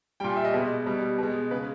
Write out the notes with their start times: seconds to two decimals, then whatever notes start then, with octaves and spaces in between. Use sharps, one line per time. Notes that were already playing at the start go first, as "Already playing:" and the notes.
0.20 A#2 G3 G5
0.29 G#5
0.36 E5
0.45 D#5
0.54 B2 G#3
0.86 B2 G3
1.18 B2 G#3
1.51 C#3 G#3 B4